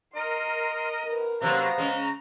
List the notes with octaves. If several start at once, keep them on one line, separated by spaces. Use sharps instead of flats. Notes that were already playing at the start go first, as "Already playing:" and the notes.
A#4 D#5 C6
A#4 B4
C3 F#3 A#3 B3 C5 F5 A#5
C#3 G#3